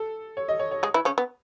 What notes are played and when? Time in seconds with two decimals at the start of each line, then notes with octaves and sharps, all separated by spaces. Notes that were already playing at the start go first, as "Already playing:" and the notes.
Already playing: A4
0.37 C#5
0.49 D#5
0.60 C#5
0.71 C#5
0.83 G#3 G#4
0.94 E3 E4
1.05 C#3 C#4
1.18 B3